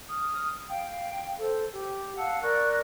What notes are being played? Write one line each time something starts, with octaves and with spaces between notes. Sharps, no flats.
D#6 F6
F5 G5
A4 C5
G4
F5 F#5 A5 E6
A#4 D5 C#6 F#6